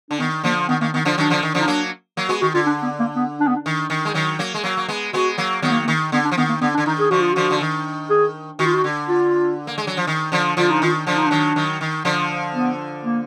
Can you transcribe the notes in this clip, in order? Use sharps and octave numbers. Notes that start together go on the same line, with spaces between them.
D3 D4
D#3 B3
D3 F3 A#3
D#3 B3
D#3 A#3
D#3 B3
D3 F3 D4
D#3 F#3 D4
D3 F3
D#3
D3 F3
D#4
F#3 A#3 D4
F#3 A#3
G#3 B3 F#4
D#3 F#4
D3 F4
D4
B3
A#3
B3
D4
B3
D4
D#3
D#3
G#3
D#3 F#3
F#3 A#3
G#3
F#3 A#3
A#3
G#3 B3
G#3 B3 F#4
F#3 A#3
D#3 F#3 B3
A#3
A#3
D#3
D3 B3
D4
F3
D#3 B3
A#3
D3 B3
D4
D3
D#3 D#4
G#4
D3 F3 F#4
F4
D3 F3 F#4
D3
D#3
G#4
D#3 F#4
F4
F#4
D3
F4
A#3
G#3
F#3
F3
D#3
D3 F3
D3 F3 F4
D#4
D#3 F4
D3 F3 D4
D#4
D#3 F#3 D4
D#3 F#3
D#3
D3 F3
B3
A#3